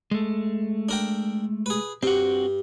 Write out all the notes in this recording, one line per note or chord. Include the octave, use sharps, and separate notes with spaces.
G#3 A3
D4 A#4 G5
G#4 B4
G2 C4 F#4